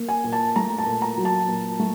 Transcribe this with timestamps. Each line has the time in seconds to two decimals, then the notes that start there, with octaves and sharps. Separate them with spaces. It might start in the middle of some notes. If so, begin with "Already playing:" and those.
Already playing: A#3
0.09 G#5
0.24 A#2
0.33 A5
0.56 A3 A#5
0.79 A5
0.86 A#2
1.02 A#5
1.17 F#3
1.25 A5
1.48 A#2
1.80 A3